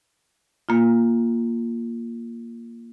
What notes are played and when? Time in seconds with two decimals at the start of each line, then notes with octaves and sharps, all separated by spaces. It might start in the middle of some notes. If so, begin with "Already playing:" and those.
0.69 A#3 F4